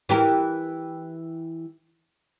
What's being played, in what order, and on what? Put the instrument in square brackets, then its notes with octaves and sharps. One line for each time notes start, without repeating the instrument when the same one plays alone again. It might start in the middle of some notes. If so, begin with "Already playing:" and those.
[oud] E3 G4 A#4